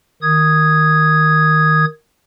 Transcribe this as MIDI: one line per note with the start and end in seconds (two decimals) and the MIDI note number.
0.22 1.85 51
0.22 1.85 87
0.22 1.85 92